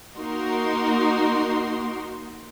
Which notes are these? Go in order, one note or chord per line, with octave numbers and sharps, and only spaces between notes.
A#3 D#4 F#4 A#4 C6